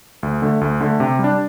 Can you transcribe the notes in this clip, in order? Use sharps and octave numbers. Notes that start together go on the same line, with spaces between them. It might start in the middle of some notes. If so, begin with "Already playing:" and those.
D2
D3 A3
D2
D3 A3
C3
G3 D4